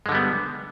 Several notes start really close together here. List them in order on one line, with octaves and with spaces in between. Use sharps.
G#3 D3 G3 B3